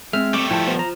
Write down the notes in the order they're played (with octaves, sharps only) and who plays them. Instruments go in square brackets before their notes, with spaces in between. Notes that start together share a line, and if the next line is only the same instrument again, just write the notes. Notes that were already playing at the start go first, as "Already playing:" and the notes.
[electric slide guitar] G#3 [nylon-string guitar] C4 C5 [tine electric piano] E5 F6
[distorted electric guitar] G3 A3 [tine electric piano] D6
[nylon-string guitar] F3 A5 [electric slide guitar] E4 [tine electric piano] G5
[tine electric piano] B3 [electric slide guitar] F4 C5
[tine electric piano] A#5